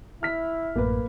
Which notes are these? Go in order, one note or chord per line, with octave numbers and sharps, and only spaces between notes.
E4 F6 B6
A1 F#2 A2 A#3 A#4 B4